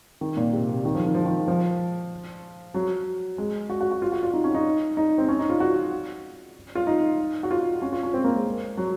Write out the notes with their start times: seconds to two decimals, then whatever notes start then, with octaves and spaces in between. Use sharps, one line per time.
0.21 D#3
0.37 A#2
0.53 C3
0.69 C3
0.85 D#3
0.95 F3
1.05 D#3
1.15 F3
1.25 D#3
1.48 F3
2.74 F#3
3.38 G#3
3.70 F#4
3.81 F#4
3.91 F#4
4.02 F4
4.12 F#4
4.23 F4
4.34 D#4
4.44 C#4
4.55 D#4
4.97 D#4
5.18 C4
5.29 C#4
5.39 D#4
5.50 F4
5.60 F#4
6.75 F4
6.87 D#4
7.43 F#4
7.51 F4
7.82 C#4
7.93 F4
8.03 C#4
8.14 C4
8.24 A#3
8.35 G#3
8.77 F#3